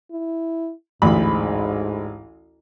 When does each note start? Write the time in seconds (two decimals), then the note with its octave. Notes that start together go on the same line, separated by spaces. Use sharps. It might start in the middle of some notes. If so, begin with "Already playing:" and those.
0.11 E4
1.02 A1 D2 G#2 B5